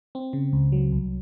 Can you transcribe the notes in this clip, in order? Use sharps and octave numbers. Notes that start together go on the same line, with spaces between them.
C4
C#3
C#2
F#3
C2